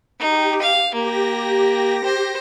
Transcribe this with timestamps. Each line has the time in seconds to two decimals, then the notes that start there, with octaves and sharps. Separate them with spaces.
0.20 D#4 G4
0.62 F5
0.94 A#3 G4 A#6
2.04 C5